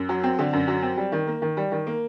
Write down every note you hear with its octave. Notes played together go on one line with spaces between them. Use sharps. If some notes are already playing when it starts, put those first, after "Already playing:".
Already playing: F#2
F#3
C4
D3
F#2
F#3
C4
G3
D#3
A#3
D#3
G3
D#3
A#3